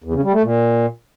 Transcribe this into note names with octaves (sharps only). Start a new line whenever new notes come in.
E2
C#3
G3
A3
A#2